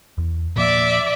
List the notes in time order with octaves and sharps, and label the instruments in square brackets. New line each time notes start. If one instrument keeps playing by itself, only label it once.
[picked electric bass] E2
[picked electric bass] A#2 F3 A#3 [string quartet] D5 E5 D6